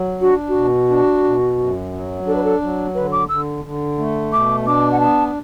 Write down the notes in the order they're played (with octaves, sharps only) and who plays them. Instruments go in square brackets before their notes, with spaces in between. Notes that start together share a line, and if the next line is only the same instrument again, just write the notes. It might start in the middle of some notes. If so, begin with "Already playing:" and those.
Already playing: [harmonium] F#3
[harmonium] D4 [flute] F#4
[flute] F#4
[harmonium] B2
D4
B2
F#2
F#3
[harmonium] D4 [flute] A4
[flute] B4
A4
[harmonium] F#3
[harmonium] D3 [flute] B4
[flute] D6
[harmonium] D3 [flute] E6
[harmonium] D3
A3
[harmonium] B2 [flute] D6
[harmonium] D4 [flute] D6
[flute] F#5
[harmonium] B3 [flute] A5